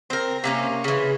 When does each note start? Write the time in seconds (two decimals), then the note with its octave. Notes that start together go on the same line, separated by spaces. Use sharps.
0.10 C4 A#4
0.44 C3 A#3 C#4
0.84 C#3 E3